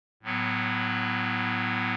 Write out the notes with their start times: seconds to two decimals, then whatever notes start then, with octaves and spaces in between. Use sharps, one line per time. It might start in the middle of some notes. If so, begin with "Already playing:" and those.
0.23 A2 F#3 B3